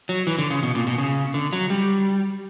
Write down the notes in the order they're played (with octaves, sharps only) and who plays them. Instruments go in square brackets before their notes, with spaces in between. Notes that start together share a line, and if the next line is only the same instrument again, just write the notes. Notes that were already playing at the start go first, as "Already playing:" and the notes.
[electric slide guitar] F#3
E3
D3
C#3
B2
A#2
B2
C#3
D3
F#3
G3